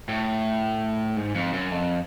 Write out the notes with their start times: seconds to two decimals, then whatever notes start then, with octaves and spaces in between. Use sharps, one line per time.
0.09 A2
1.17 G#2
1.35 F2
1.53 F#2
1.71 F2